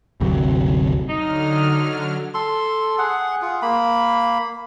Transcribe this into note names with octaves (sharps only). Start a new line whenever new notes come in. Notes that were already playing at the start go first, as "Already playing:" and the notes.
G1 D2 C3 F#3
D3 F#3 D#4 F6
A4 C6
G#4 F#5
F4 G#4
A#3 B5